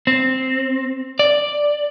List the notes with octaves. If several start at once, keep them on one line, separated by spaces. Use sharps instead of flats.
C4
D5